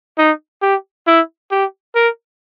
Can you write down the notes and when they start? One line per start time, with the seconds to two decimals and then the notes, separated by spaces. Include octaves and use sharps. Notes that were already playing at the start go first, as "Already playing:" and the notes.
0.18 D#4
0.62 G4
1.07 E4
1.51 G4
1.95 A#4